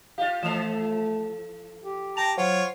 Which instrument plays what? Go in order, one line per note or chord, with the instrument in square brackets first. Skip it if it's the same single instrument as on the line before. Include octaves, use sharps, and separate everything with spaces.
[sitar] F4 G4 [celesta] F5
[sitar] E3 F3 A4 [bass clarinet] A3 [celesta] E7 F7
[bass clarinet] G4
[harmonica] G5 A5 A#5 [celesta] F7
[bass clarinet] F#3 [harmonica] F4 C#5 [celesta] C5 F#5